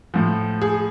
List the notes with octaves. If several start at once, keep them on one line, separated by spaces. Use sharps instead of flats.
A2 F3
G#4